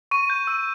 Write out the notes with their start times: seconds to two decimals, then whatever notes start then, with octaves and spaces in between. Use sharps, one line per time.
0.11 C#6 D#7
0.30 G6
0.47 E6